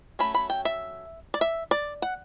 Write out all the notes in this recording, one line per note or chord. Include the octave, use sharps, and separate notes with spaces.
F#3 A3 C#4 B5
B5
G5
E5
D5
E5
D5
F#5